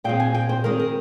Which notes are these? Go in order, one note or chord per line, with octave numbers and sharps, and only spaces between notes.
A#2 G#3 C4 G5
G#5
G5
C5
D#3 G#3 C4 A#4
A#4